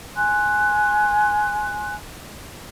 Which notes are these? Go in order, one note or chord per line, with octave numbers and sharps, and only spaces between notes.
G#5 C6 F#6